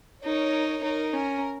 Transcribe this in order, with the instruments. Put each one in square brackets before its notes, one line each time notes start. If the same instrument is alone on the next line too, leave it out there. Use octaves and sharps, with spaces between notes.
[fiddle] D#4 [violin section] A#4 C#5
[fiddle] D#4 [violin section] A#4
[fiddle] C#4 [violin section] A#4